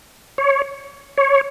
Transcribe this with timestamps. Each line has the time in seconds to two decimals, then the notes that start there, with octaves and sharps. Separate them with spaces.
0.38 C#5
1.18 C#5